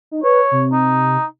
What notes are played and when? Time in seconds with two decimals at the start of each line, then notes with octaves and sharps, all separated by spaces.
0.11 D#4
0.23 B4 C#5
0.51 C3
0.72 D#4